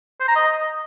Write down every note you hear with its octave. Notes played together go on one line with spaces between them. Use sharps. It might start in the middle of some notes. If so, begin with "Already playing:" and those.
C5
A#5
D#5